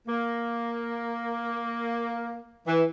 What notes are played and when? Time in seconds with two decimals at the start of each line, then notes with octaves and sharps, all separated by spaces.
0.08 A#3
2.67 E3